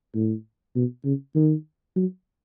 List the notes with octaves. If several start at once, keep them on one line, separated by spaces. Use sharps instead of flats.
A2
B2
C#3
D#3
F#3